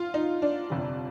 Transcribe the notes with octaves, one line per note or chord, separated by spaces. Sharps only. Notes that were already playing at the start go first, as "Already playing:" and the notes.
Already playing: F4
D#4
D4
G1 F2 C3 G3